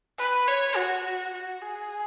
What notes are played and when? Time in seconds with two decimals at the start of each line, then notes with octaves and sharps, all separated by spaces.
0.19 B4
0.48 C#5
0.76 F#4
1.34 F#4
1.61 G#4